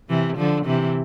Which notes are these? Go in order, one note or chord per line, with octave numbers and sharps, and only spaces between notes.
C3 E3
D3 F3
C3 E3